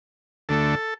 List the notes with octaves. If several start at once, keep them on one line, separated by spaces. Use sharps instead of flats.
D2 D3 A3 A4